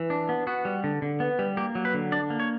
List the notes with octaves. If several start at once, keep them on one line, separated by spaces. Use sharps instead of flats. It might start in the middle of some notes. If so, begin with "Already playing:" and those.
Already playing: E3
D4
B3
B3 F#4
G3
D3
D3
B3
G3
A#3 G4
F#3
B4
D3
D4 D5
A#3
C#5